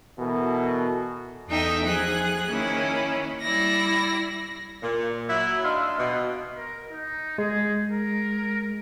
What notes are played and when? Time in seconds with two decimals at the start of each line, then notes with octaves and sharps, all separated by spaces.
0.18 B2 E3 B3 F#4 A4 A#4
1.48 E2 D#4 A4 E5 G5
1.84 F3 G#4 F#6
2.49 D#3 A#3 C#4 E4
3.40 G3 E4 D5 A#6
4.83 A#2
5.29 F#3 E4
5.63 D4 D#4 E5 F5 C6
5.98 B2
6.57 A#4
6.91 D#4
7.38 G#3 G#4
7.91 A#4